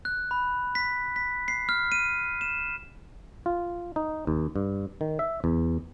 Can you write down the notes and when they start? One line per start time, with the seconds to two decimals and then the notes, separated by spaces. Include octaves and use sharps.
0.05 F#6
0.31 B5
0.75 B6
1.16 B6
1.48 C7
1.69 F6
1.92 D#7
2.41 E7
3.46 F4
3.96 D#4
4.27 D#2
4.56 G2
5.01 D#3
5.19 E5
5.44 E2